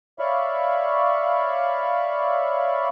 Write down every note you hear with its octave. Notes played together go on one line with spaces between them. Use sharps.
C#5 D5 E5 F5 B5 C#6